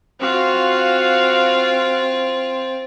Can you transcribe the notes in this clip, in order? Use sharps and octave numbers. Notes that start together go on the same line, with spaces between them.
C4 F4 F#4 F5